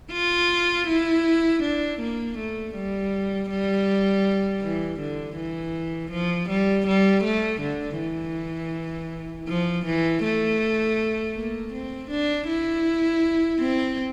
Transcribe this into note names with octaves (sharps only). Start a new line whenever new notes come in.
F4
E4
D4
A#3
A3
G3
G3
E3
D3
E3
F3
G3
G3
A3
D3
E3
F3
E3
A3
A#3
C4
D4
E4
C4